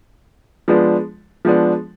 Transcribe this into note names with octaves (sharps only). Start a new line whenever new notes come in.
F3 G#3 B3 D4
F3 G#3 B3 D4